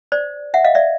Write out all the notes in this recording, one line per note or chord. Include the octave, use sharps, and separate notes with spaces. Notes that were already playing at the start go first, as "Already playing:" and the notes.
C5 D5
E5 F#5
D#5 F5
D5 E5